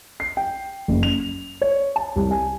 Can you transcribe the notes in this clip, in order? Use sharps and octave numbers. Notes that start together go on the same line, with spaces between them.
C7
G5
F#1
F7
C#5
A5
C2
G#5